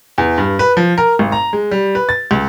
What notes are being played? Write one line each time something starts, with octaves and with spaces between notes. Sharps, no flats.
E2
G2
B4
F3
A#4
G#1
A#5
G#3
G3
B4
A6
C#2